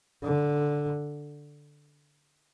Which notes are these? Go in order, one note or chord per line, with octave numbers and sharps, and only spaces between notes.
D3